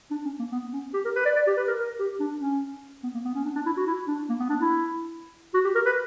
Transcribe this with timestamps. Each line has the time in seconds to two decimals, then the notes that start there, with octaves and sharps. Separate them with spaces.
0.11 D4
0.25 C#4
0.39 A#3
0.52 B3
0.73 C#4
0.94 G4
1.05 A#4
1.16 B4
1.25 D5
1.36 D5
1.47 G4
1.57 B4
1.67 A#4
1.78 A#4
2.00 G4
2.20 D4
2.41 C#4
3.03 B3
3.14 A#3
3.25 B3
3.35 C#4
3.45 D4
3.55 D4
3.66 E4
3.77 F#4
3.87 E4
4.08 D4
4.29 A#3
4.40 B3
4.50 D4
4.61 E4
5.54 F#4
5.65 G4
5.75 A#4
5.86 B4